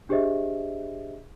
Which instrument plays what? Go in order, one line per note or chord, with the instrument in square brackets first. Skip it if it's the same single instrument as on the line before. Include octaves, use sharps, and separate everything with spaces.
[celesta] D4 G4 G#4 C5 D#5 E5